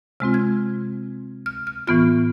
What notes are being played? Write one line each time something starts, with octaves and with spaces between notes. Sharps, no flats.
C3 G#3 C4 F4 F6
G#6
F6
F6
A2 E3 B3 F4 F6